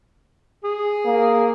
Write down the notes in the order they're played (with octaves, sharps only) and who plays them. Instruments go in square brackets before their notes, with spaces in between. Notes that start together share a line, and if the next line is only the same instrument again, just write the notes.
[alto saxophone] G#4
[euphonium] A#3